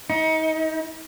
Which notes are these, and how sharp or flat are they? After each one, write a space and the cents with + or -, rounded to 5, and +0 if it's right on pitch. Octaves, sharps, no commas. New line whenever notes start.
D#4 +35